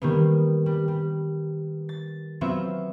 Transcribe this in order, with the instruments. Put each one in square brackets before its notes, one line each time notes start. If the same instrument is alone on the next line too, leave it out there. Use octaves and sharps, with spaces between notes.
[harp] D#3 G3 A#3 B3
G3
G3
A6
F#3 B3 C4 F4 E5